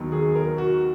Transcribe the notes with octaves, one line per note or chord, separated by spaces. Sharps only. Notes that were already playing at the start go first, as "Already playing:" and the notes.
Already playing: D#2 D#3 F#3 B3
G#4
A#4
F#4